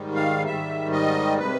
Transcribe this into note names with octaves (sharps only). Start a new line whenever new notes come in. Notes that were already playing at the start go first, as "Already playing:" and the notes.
Already playing: G#2 D#3 G3
F5
G#2 D#3 G3 E5
D#5
C3 D#3 B4